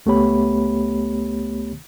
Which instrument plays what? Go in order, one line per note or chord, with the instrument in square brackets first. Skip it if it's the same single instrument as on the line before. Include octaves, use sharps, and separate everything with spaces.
[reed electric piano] C#2 A3 B3 G4 C#5 B5